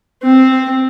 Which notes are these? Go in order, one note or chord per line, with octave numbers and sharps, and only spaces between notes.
C4